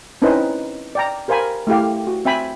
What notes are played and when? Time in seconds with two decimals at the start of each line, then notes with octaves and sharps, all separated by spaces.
0.22 C4 C#4 D#4 E4 B4 C5
0.95 D5 G5 A#5
1.28 G4 A#4 C5 F5 G#5 B5
1.67 A3 E4 G4 F5
2.07 F#4
2.25 C4 E5 G5 G#5 B5